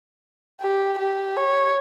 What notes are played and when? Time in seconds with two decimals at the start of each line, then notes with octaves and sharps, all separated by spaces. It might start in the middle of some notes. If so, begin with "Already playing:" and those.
0.61 G4
0.99 G4
1.37 C#5